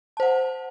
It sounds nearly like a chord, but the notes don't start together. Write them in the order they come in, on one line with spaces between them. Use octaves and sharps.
A5 C5 F#5